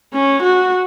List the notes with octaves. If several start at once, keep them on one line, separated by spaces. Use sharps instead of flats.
C#4
F#4